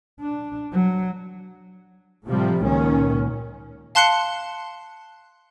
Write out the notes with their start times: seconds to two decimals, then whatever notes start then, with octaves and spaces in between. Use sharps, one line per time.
0.21 D4
0.73 F#3
2.27 A2 C3 F3 G3
2.63 C#2 A#2 D#3 C#4
3.95 F5 A5 C6 F#6 C7 C#7